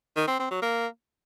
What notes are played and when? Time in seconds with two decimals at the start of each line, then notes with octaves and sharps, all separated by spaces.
0.17 D#3
0.28 C4
0.39 C4
0.51 F#3
0.62 A#3